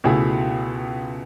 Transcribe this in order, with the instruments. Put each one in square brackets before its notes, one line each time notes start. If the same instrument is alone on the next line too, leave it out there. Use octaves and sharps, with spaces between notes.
[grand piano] C#2 B2 A3 E4 G#4